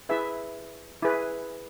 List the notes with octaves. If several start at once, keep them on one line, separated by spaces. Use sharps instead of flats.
E4 G#4 B4 E5
E4 G#4 B4